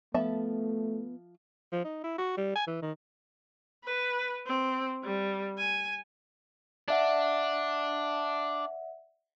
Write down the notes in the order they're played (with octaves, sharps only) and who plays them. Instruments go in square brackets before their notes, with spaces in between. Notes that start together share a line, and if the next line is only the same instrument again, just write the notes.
[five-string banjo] F3 E5 A5 [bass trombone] A3 [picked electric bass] B3
[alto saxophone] F3
D#4
E4
F#4
G3
G#5
E3
D#3
[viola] B4
C4
G3
G#5
[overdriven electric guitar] D4 [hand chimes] D5 E5 F#5